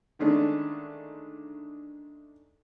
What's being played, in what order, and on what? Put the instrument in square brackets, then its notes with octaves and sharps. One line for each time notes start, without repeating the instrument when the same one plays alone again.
[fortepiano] D3 D#3 G#3 A3 C#4 D4